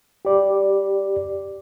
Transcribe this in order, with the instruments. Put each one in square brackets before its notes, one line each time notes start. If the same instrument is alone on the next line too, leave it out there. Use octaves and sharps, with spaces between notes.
[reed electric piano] G4 D5